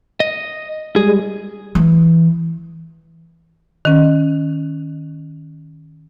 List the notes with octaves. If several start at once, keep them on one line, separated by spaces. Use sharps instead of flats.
D#5
G3 G#3 G#4
E3
D#3 C#4